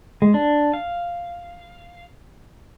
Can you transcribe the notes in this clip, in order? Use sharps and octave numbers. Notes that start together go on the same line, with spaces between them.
G#3
D4
F5